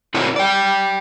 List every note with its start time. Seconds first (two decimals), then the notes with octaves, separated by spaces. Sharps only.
0.14 C4 D4 E4 F#4 A#4 C#5
0.36 D5 G5